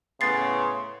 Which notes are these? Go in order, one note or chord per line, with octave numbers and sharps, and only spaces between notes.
A2 C#3 B3 C#4 C6 A6 C7